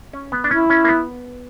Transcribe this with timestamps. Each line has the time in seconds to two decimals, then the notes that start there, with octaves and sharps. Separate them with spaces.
0.13 C#4
0.32 B3
0.44 D4
0.51 C#4 E4
0.70 C#4
0.84 A#3
0.89 B3